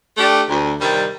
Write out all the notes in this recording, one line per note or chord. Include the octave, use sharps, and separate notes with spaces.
A3 D4 G4 D5
D2
C3 D#3 G3